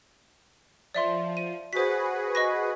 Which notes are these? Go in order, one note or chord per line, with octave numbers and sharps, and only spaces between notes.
F3 D5 E5 C6
D#7
F#4 G#4 B4 C5 B6
D#5 C#6 A#6